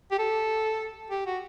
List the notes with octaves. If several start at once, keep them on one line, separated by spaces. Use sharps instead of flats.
G4
A4
G4
F#4